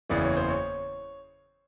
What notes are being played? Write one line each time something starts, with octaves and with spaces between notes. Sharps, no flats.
F#1 E2 C#3 E3 D5
C#5
C5
C#5